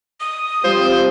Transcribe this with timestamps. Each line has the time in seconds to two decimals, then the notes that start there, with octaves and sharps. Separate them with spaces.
0.20 D#6
0.64 F3 G3 C4 C5